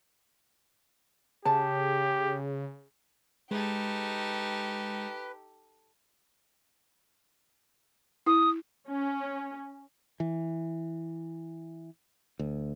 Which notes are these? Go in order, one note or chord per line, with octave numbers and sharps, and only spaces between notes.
C#3 G4 A5
G#3 D#4 G4 A4 B4
E4 D#6
C#4
E3
D2